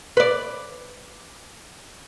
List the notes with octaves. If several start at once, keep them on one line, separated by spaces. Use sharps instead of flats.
B4 D5